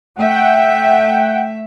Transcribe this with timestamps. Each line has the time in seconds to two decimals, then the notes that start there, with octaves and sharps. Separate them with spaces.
0.16 A3 E5 F#5 G5